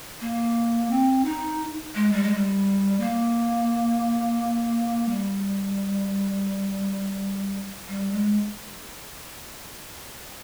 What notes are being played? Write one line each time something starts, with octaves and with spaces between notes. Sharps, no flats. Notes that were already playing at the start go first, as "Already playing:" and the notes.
A#3
C4
D#4
G#3
G3
G#3
G3
A#3
G3
G3
G#3